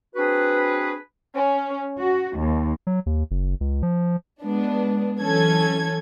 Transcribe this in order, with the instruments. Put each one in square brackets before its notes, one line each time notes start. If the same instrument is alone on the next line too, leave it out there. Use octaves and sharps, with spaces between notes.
[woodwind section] C4 D4 F#4 G#4 B4
[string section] C#4
F#4
D#2
[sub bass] F#3
D#2
F#1
C#2
F3
[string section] G#3 B3 D4
E3 F#3 C#4 A4 G#6